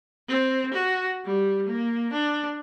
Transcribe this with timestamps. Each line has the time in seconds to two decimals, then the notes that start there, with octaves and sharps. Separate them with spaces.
0.29 C4
0.74 F#4
1.25 G3
1.66 A#3
2.13 D4